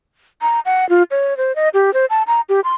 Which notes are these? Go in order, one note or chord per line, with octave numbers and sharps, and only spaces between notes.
A#5
F#5
F4
C#5
C5
D#5
G4
C5
A5
A#5
G4
C6